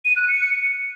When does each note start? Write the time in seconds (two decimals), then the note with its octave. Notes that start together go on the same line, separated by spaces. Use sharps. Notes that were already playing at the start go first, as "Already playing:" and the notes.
0.05 D#7
0.16 F#6
0.28 C#7